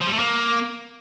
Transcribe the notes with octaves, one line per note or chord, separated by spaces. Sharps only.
F3
G3
A3
A#3